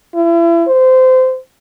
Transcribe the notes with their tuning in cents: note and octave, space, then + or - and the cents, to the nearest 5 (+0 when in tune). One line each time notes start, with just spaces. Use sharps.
E4 +35
C5 -20